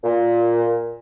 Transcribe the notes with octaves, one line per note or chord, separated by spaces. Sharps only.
A#2